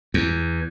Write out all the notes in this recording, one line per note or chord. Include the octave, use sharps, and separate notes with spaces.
E2